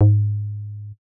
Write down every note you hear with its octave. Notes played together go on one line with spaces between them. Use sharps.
G#2